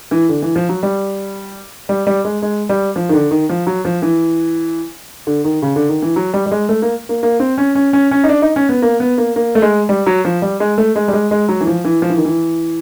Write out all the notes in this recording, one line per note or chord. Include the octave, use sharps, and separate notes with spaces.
E3
D3
E3
F3
F#3
G3
G3
G3
G#3
G#3
G3
F3
D#3
D3
D#3
F3
F#3
F3
E3
D3
D#3
C#3
D3
D#3
E3
F#3
G3
G3
G#3
A3
A#3
A#3
A#3
C4
C#4
C#4
C#4
C#4
D#4
D4
D#4
C#4
B3
A#3
B3
A#3
A#3
A3
G#3
G3
F#3
F3
G3
G#3
A3
G#3
G3
G#3
G#3
F#3
E3
F3
E3
F3
E3
D#3
E3